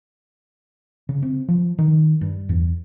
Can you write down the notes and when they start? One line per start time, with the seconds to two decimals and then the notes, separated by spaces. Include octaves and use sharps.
1.09 C#3
1.22 C4
1.48 F3
1.78 D#3
2.21 G2
2.49 E2